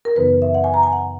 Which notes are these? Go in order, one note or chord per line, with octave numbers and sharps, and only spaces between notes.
A#4
F#2 C#3 E3 B3 D#4 B4
E5
F#5
G#5
A#5
G#5
F#5